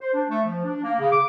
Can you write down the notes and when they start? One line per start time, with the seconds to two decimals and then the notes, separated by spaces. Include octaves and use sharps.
0.01 C5
0.14 D4
0.30 A3
0.45 F3
0.64 D4
0.83 A#3
0.99 C#3
1.12 D6